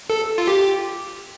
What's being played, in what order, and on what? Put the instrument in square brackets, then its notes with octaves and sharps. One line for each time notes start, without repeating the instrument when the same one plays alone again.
[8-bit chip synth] A4
F4
G4